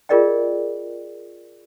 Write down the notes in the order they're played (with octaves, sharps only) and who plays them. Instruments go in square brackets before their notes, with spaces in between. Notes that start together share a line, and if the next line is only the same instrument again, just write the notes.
[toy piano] F4 G#4 A#4 D5 D#5 G5